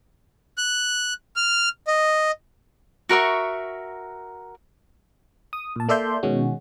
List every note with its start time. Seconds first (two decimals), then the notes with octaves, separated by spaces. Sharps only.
0.58 F#6
1.36 F6
1.87 D#5
3.09 F#4 A#4 E5 C#6
5.53 D#6
5.76 A#2 A5
5.89 A#3 A4 D5 E5 C6 G6
6.23 B2 D#3 G#3 C#4 F#4